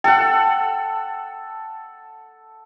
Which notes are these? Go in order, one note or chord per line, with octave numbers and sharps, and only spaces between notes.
A4 F#5 G5